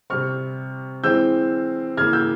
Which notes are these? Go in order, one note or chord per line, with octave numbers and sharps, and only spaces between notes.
C3 G3 C4 C#6 F6
E3 G#3 C4 E6 G6
C#3 E3 A#3 F6 G#6
E6 G6